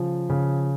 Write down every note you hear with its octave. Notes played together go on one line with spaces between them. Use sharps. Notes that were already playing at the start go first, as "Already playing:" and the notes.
Already playing: C#3 F3
C#3